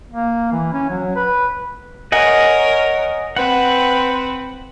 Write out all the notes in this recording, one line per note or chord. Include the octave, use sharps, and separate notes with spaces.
A#3
E3
C#4
F#3
B4
A#4 C#5 D#5 F#5 G#5
C4 B4 F#5